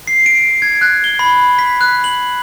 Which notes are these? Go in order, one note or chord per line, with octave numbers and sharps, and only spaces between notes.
C7
D7
G#6
F#6
G7
B5
B6
F#6
F#7